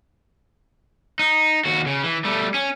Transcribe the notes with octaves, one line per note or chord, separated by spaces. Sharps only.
D#4
D#2 F#4
C#3
E3
G3 A3
C#4